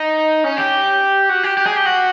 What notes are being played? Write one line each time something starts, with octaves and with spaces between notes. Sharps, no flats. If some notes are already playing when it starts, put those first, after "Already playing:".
Already playing: D#4
C#4
G4
F#4
G4
G4
G#4
G4
F#4